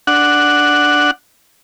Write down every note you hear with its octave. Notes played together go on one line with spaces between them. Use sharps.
D4 F#5